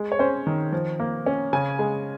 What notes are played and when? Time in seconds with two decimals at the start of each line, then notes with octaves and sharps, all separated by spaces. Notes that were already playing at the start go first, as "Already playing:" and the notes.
Already playing: G#3
0.12 C#5
0.19 C#4 C5
0.47 D#3
0.72 F3
1.00 A#3
1.26 C#4
1.53 C#3 G#5
1.79 G#3